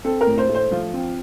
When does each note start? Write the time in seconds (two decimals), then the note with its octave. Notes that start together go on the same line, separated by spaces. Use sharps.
0.04 C4 A4
0.21 A#4
0.26 A2
0.38 C5
0.49 A3
0.55 C5
0.71 F3 F4
0.94 C4